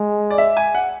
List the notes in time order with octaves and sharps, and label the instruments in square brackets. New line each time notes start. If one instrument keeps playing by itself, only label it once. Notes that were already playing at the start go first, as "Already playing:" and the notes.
Already playing: [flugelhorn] G#3
[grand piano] D5
E5
G#5
F#5